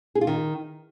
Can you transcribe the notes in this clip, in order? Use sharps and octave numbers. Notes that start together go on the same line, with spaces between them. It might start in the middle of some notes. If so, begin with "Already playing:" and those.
G#4
F4
D#3